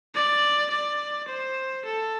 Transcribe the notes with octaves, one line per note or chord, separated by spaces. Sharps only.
D5
D5
C5
A4